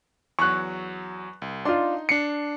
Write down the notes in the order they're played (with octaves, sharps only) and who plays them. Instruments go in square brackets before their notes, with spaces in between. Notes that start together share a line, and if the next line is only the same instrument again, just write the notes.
[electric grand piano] E2 F#3 [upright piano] C#6 F#6
[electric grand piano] C2
[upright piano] D4 F4 [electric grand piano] D#4 C6
[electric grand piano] D4 C7 [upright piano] C#7